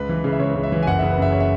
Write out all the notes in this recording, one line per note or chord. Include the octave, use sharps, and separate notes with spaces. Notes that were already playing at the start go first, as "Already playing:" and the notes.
Already playing: C#2 B4
E3
C#3
E5
C#2 C#5
C#2
E5
E3
G#5
F#1 F#5
C#3 E5
B4
F#2 E5
C#5
E5